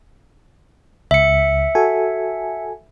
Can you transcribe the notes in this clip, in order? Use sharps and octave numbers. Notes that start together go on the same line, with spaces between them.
C#2 E5 C#7
F#4 A4 G#5